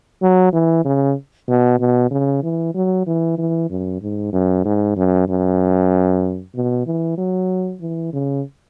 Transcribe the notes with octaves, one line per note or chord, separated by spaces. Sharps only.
F#3
E3
C#3
B2
B2
C#3
E3
F#3
E3
E3
F#2
G#2
F#2
G#2
F#2
F#2
B2
E3
F#3
E3
C#3